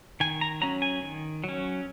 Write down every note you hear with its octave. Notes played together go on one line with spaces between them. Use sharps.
D#3 G#5
A#5
F#3 C#4 A#5
G#5
D#3
F#3
C#4